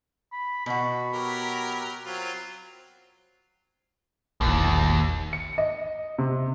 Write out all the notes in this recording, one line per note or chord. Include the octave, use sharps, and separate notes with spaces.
B5
B2 F#4 B5
F#3 G4 A#4
F#3 C4 F4
E1 A#1 D#2
C#7
D#5
C3